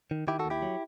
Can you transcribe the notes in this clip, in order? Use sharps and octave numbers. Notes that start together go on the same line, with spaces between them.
D#3
D#3 E4 G4
F#4 A4
D#2
E4 G4
F#3